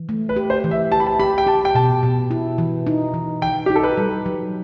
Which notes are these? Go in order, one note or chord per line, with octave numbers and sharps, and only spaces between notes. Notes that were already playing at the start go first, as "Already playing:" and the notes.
Already playing: E3
A3
B4
G4
C5
E3
E5
G4 A5
B5
A5
G4 B5
G5
G4 A5
G5
B2 A5
B2
E4
E3
D#4
E3
E3 G5
D#4 G4
A4
B4
G3
F#3